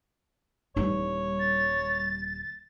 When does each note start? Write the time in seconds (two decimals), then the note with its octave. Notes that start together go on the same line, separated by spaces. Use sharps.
0.76 D#1 E3 G3 D#4 C#5
1.39 A6